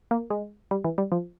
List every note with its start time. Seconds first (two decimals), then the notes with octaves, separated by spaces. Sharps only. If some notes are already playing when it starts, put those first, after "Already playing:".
0.11 A#3
0.30 G#3
0.71 G3
0.84 E3
0.98 G3
1.12 F3